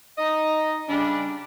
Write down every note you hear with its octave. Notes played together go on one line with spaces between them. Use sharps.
D#4 D#5
C#3 G3 D4